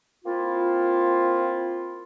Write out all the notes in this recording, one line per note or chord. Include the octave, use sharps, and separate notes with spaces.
A#3 C4 E4 F4